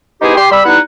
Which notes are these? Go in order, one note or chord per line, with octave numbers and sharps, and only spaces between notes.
B3 D#4 E4 G4 G#4 C5
G4 C6
G3 B5 E6
G3 B3 D#4 E4 F#5